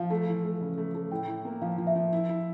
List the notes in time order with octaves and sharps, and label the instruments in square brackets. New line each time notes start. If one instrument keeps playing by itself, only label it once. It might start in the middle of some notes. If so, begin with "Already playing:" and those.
Already playing: [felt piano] F3 [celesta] F5
[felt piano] A3
E3
A3
C#3
A3
A3
[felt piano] A2 [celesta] G5
[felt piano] A2
A#3
[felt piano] F3 [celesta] F5
[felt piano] F3
[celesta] E5
[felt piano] F3
E4
E4